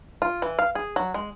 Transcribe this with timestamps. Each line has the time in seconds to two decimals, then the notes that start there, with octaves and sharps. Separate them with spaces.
0.22 F4
0.42 E3
0.59 F5
0.75 G#4
0.96 F#3
1.14 G#3